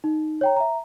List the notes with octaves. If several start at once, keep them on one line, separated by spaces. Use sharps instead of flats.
D#4
C#5 G5 A#5
E5 A#5